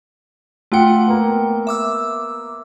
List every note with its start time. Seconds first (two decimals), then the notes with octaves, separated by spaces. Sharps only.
0.72 A3 F4 F#5 G5 C#7
1.07 A#3 B3
1.67 E5 D6 E6